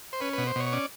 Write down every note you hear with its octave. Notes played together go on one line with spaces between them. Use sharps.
C5
C#4 B4
B2 B4
C5
B2 C#5
C#5
C#4 D5